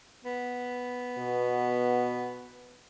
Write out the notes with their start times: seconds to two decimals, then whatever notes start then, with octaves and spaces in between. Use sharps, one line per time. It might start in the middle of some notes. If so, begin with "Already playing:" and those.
0.25 B3
1.18 B2